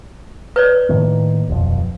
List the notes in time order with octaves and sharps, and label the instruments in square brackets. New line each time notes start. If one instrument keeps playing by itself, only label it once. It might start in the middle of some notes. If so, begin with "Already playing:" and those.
[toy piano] B4 C#5 D5
[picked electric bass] A2 D#3 A#3
D#1 B1 F2